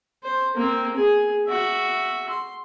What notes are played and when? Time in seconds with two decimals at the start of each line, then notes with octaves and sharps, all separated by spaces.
0.24 C5
0.55 A#3 C4
0.95 G#4
1.48 F#4 E5
2.29 C6